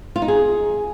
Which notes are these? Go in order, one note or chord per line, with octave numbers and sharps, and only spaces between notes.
F4
D#4
G#4